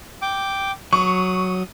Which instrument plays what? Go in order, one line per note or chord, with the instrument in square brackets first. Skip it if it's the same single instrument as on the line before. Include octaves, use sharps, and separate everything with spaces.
[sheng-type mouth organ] G5 D6
[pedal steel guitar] F#3 [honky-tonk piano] C#6 [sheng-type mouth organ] D#6